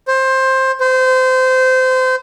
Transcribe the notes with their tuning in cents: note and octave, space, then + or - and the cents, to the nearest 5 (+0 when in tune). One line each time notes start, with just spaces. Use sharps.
C5 +15
C5 -25